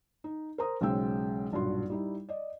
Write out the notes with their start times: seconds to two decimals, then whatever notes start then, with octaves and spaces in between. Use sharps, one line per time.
0.24 D#4
0.58 A#4 C5 A#5 D#6
0.81 B1 C#3 G#3 C5 G5 E6
1.52 B1 G2 A#2 D4 F#4 C6
1.90 G3 D#4 E4
2.29 D5 D#5